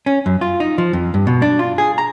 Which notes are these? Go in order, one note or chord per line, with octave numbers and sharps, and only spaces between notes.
C#4
F#2
F4
D#4
F3
F2
G2
B2
D4
F4
G#4
A#5